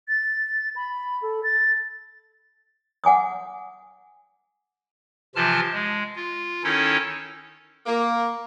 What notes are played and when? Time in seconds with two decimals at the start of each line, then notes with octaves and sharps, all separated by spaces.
0.08 A6
0.76 B5
1.22 A4
1.44 A6
3.04 F#5 G#5 D6 D#6
5.36 C3 E3 F3 F4 A5 F6
5.73 G#3
6.16 F4
6.64 D#3 C#4 D#4 E4 A4 C#5
7.86 A#3